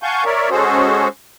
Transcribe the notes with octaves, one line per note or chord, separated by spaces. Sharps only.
F5 F#5 G#5 A5 C#6 G6
A#4 C#5 D5 E5
G#3 C#4 F#4 G#4 A4 C5